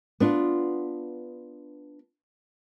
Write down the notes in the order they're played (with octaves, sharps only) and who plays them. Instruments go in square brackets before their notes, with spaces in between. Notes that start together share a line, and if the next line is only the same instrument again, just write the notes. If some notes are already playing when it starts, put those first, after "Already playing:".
[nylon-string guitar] B3 D4 F4